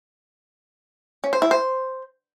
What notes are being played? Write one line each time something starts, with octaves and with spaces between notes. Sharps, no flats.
C#4
C5
E4
C5